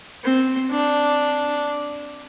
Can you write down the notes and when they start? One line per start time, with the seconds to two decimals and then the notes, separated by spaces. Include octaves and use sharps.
0.24 C4
0.71 D4